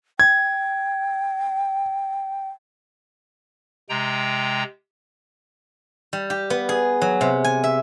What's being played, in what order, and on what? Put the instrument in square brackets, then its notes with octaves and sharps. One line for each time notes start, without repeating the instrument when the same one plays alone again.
[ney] G5 [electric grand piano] G#6
[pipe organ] C3 G#3 G5 A#5
[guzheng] G3
G4
B3
G#4
F#3
C3
G#5
E5